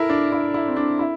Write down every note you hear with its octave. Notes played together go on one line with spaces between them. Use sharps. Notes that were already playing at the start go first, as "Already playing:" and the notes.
Already playing: E4 A4 A#4
D4
E4
E4
C4
D4
E4